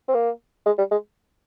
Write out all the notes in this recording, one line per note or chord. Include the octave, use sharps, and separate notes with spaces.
C4
A#3
G#3
G3
G#3